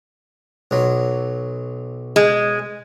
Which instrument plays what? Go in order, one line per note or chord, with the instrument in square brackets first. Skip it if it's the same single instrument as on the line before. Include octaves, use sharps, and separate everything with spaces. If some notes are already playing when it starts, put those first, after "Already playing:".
[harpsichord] B1 F#3
[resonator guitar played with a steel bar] G#3